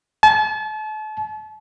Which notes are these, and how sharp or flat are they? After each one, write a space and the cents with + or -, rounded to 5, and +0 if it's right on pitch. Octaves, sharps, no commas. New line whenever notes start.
A5 -35